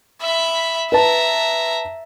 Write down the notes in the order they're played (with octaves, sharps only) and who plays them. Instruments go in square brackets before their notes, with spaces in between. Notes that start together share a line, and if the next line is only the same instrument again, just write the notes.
[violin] E5 B5
[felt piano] B4 A5 [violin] E5 A#5